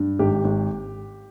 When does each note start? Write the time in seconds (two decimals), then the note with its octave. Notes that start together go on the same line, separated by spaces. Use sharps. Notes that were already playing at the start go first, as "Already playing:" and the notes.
Already playing: G2
0.19 G#1 G4
0.44 G#1